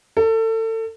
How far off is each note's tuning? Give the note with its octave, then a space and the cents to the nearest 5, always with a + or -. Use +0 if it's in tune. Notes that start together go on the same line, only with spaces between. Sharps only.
A4 +30